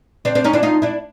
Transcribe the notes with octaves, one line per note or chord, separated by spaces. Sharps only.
C4 D4
C4 D4
C#4 D#4
D4 E4
D#4 F4
D4 E4